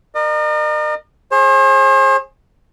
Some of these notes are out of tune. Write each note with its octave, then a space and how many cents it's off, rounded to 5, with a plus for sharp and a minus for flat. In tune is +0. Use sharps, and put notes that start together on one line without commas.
A#4 +0 D#5 -45
G#4 +0 C5 +45